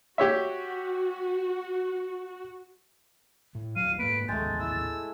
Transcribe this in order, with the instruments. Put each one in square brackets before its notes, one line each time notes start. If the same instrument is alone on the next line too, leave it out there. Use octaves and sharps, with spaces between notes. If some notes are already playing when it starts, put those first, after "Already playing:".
[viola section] F#4 [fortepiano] G4 C#5 E5
[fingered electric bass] A2
[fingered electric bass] D#1 F#3 [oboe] F5 [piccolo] D#7
[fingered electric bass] G#2 A3 A#3 [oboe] B4 [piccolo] D7
[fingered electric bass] A1 D#2 [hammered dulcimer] G#3 A3 [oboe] G5 [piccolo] A6
[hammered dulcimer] E4 [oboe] E6